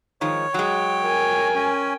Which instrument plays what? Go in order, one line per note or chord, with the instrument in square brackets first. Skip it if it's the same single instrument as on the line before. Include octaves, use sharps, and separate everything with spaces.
[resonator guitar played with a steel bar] D#3 F3 G#3 [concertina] C#5
[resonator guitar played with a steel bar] F#3 G#3 [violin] G5
[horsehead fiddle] A#4 G#5
[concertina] C#4